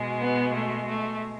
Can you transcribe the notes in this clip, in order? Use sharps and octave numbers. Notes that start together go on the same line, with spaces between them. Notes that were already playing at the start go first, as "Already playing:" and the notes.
Already playing: B2 G#3
B3
A3
A3